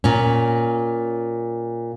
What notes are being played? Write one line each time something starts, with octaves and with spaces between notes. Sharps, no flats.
A#2 C#4